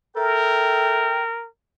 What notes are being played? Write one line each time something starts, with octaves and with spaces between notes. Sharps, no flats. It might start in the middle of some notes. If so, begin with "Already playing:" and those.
A4 A#4 E5 G5